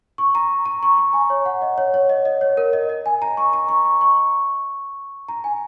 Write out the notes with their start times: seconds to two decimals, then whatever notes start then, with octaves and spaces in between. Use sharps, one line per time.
0.18 C#6
0.35 A#5
0.66 A#5
0.83 C#6
0.98 A#5
1.13 G#5
1.30 C#5
1.46 F#5
1.62 D#5
1.78 C#5
1.94 C#5
2.09 D#5
2.25 D#5
2.41 C#5
2.57 A#4
2.73 D#5
2.89 D#5
3.06 G#5
3.22 A#5
3.37 C#6
3.53 A#5
3.69 C#6
3.85 C#6
4.01 C#6
5.29 A#5
5.44 G#5